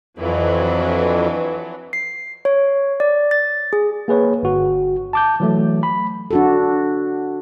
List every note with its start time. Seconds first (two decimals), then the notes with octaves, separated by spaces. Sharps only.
0.18 F2 E3 F#3 D4
1.93 C7
2.45 C#5
3.00 D5
3.31 A6
3.73 G#4
4.08 A#3 G#4 B4 C#5
4.43 G1 F#4
5.13 A5 D6 G6
5.40 E3 F#3 A3
5.83 B5
6.31 D4 F#4 A4